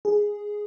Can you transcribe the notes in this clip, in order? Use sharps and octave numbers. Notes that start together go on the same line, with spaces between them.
G#4